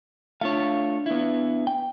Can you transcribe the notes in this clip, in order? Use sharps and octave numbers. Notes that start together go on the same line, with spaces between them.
A3 D4 F4 C#5 F5
B3 E4
G5